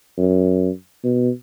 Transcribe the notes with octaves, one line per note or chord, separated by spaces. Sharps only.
F#2
B2